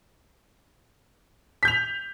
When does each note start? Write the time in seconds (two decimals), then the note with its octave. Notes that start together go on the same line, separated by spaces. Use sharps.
1.63 B6
1.65 G6
1.68 F7